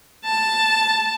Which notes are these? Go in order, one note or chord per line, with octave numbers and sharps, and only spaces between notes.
A5